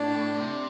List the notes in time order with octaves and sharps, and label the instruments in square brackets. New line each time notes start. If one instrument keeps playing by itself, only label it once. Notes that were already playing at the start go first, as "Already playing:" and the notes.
Already playing: [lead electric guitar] A2 [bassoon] D4
[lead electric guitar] C3